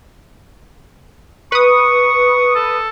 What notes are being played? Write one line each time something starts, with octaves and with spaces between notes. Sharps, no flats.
B4 C#6 D#6
A4